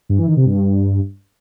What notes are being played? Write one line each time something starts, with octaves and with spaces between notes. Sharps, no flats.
G2
E3
D#3
C3
G2